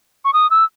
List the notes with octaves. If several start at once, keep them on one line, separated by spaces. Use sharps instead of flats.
C#6
D#6
E6